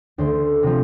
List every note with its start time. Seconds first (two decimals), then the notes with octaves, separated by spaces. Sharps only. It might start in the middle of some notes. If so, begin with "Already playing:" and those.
0.18 D2 C5
0.63 C3 F3